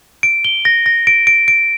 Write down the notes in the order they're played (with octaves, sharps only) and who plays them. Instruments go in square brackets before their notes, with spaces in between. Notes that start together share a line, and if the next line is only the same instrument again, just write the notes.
[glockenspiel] D7
G7
A#6
A#6
D7
D7
D7